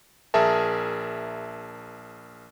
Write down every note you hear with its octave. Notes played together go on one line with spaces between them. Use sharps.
A#1 G#4 A#4 E5 A5